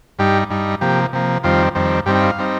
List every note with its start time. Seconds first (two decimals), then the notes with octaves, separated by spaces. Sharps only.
0.19 G2 G3 D#4 G4
0.50 G2 G3 D#4
0.81 C3 F3 A#3 G4
1.13 C3 F3 A#3
1.43 F2 D#3 G3 C4 F4
1.75 F2 D#3 G3 C4
2.06 G2 G3 C4 D#4 G4
2.15 G5
2.21 F5
2.39 G3 C4 D#4